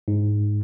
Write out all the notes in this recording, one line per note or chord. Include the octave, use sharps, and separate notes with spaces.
G#2